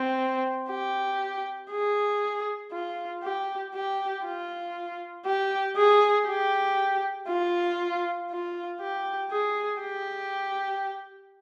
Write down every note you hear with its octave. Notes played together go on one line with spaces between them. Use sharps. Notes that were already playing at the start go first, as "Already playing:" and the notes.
Already playing: C4
G4
G#4
F4
G4
G4
F4
G4
G#4
G4
F4
F4
G4
G#4
G4